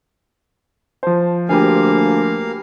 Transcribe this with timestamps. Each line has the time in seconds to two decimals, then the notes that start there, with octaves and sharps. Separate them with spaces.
1.03 F3 C5 A5
1.49 D2 A#3 G4 B4 F5 G#5